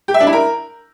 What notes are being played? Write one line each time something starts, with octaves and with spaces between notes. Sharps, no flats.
G4
E5
D4
E4
A#4